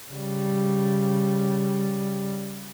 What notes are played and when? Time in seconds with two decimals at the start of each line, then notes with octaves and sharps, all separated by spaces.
0.11 C#3 G3